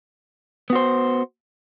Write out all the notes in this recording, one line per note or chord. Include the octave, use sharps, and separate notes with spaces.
B3 F#4 C5